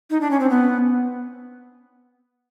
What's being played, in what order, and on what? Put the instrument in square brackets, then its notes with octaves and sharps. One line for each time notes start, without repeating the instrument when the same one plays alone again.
[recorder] D#4
D4
C#4
C4
B3